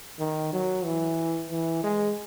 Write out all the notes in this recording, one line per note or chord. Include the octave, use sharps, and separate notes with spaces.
D#3
F#3
E3
E3
G#3